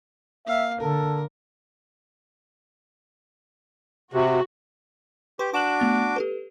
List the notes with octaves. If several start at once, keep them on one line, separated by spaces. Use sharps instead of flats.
A#3 E5 F5
D3 A4 A#4
C3 F#4
G4 B4 C6 C#6
D4 F#4 C#6 D6 E7 F#7
A3 B3 A6
G4 A4 B4